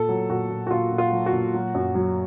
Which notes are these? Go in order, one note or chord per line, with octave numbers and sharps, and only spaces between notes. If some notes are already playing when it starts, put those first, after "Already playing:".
Already playing: A#2 A4
F#3
A#2 F#4
A#2
F#4
A#2 F4
A#2
F4
F#3
F#4
A#2
F#3
F#2
F#3